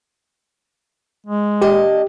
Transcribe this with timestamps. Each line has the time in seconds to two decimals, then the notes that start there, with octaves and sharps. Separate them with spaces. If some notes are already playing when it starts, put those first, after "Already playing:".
1.26 G#3
1.62 A#2 D4 G4 D#5